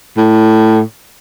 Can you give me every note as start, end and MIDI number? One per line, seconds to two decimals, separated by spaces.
0.17 0.81 45